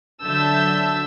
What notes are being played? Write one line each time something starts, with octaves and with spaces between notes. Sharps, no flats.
D3 F#3 E5 A5 E6 G6